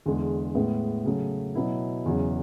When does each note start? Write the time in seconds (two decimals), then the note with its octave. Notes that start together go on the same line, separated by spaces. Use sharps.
0.06 E2 D3 G#3
0.55 A2 G#3 B3
1.05 C#3 F#3 A3
1.55 B2 F#3 B3 E4
2.05 E2 C#3 F#3